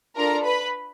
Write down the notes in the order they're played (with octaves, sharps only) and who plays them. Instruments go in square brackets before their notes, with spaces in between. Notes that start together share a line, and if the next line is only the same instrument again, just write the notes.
[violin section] D4 F4 A4 A#4 A#5
B4 B5